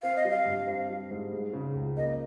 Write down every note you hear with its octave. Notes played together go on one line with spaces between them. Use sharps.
C4 F5
D#5
G3
F5
G2
C4
G3
G#2
G#3
C#3
C#2
A#3 D#5